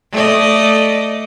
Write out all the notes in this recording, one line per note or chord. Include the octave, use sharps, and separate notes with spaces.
A3 D5 D#5